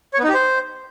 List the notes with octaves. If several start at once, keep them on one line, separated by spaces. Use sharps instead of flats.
C#5
B3
D#4
G4
C5